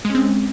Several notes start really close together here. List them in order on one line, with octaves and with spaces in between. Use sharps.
G#3 C#4 C4